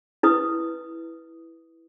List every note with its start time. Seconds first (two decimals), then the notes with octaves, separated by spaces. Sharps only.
0.23 E4 B4 D#6